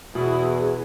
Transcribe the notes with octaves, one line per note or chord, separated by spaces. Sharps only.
E2 B2 E4 F#4 G#4